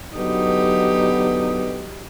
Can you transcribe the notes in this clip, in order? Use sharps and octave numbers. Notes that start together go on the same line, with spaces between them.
B2 D3 F#3 B3 D#4 G4